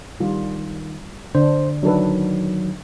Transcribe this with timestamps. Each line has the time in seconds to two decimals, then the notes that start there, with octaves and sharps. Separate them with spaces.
0.20 D#3 G3 F4
1.35 D3 D4 C5
1.83 D#3 F#3 D4 A4 B4